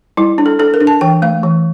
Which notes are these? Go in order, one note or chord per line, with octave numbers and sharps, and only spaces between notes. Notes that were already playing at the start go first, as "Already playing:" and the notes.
G3 E4
D4
A4
D4 A4
A#4
D4
A5
E3 G5
A3 F5
E3